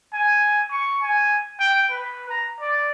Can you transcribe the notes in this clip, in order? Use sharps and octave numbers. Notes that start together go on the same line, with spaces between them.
G#5
C#6
G#5
G5
B4
A#5
D5